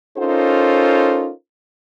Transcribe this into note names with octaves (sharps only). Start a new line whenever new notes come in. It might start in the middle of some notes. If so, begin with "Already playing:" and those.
C#4 D#4 F4 A4 A#4 C5